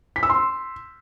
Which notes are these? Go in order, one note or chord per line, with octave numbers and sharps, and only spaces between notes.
B6
E6
C6